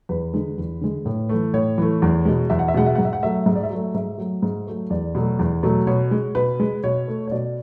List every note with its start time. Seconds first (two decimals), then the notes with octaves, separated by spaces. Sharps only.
0.09 E2 B4
0.34 D3 G#3
0.58 E2
0.81 D3 G#3
1.05 A2
1.29 E3 A3
1.54 A2 C#5
1.78 E3 A3
2.02 E2
2.25 B2 G#3
2.50 E2 E5
2.59 F#5
2.68 E5
2.74 B2 G#3 F#5
2.86 E5
2.95 G#2 F#5
3.05 E5
3.13 F#5
3.23 F#3 A3 E5
3.46 G#2 E5
3.55 D5
3.63 E5
3.70 F#3 A3
3.94 G#2 E5
4.18 F#3 A3
4.42 G#2
4.67 F#3 A3
4.90 E2 D5
5.15 B2 F#3 A3
5.39 E2
5.63 B2 F#3 A3
5.87 B2 C#5
6.11 G#3
6.35 B2 B4
6.60 G#3
6.83 B2 C#5
7.08 A3
7.27 C#5
7.31 B2 D5